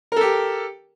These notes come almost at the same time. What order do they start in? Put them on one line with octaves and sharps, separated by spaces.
A#4 A4 G4